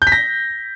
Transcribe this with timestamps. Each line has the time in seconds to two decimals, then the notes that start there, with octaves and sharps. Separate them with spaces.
0.02 G6
0.07 B6
0.12 A#6